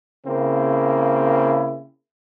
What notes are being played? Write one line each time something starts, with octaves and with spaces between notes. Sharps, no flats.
C#3 A#3 C4 E4